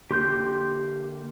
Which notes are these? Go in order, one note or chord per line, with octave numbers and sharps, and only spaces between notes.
D3 A#3 G4 C6 G6